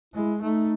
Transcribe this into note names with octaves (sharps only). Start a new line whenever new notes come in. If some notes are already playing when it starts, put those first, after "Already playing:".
G#3 E4
A3 D#4